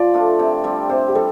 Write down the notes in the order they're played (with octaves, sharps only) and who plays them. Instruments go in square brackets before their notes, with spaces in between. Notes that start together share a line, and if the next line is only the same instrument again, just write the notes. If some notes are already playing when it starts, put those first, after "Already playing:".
Already playing: [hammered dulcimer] F3 [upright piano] D5
[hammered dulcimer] A3 D4 F4
C3
G3 C4
[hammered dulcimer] C3 [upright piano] C5
[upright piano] G4
[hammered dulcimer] G3 [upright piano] A4